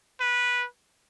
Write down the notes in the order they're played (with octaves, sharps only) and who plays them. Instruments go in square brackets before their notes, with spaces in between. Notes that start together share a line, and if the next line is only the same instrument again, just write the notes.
[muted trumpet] B4